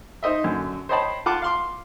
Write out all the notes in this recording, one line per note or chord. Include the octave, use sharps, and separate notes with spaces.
D#4 C5 D#5 E5
F#2 D3
C5 C#5 D#5 G5 A5 B5
F4 F#5 G5 A5 D6
F5 C6 D6